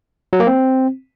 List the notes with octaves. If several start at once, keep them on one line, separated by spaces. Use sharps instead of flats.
F#3
A#3
C4